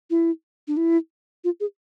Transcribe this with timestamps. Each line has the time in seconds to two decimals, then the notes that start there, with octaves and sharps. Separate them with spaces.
0.10 E4
0.68 D4
0.77 E4
1.44 F4
1.60 G#4